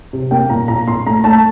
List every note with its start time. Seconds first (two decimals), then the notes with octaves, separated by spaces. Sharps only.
0.13 C3
0.31 A#3 G5
0.50 A#2 A#5
0.68 A#2 A#5
0.87 A#2 C6
1.06 A3 A#5
1.24 A3 A5